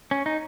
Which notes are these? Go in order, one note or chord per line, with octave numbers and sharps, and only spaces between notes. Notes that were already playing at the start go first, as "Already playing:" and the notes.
C#4
D#4